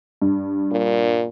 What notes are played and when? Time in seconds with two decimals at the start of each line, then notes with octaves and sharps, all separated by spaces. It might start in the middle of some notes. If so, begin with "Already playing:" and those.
0.22 G2
0.71 A#2